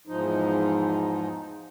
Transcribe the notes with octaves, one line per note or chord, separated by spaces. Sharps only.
E2 G#2 F3 D#4